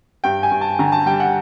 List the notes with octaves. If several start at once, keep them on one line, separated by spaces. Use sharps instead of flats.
G2 G5
G#5
G2
A5
D3 A#5
G#5
A5
G3 G5
F#5